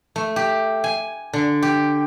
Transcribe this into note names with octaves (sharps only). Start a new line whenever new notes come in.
A3
G4
G#5
D3
G4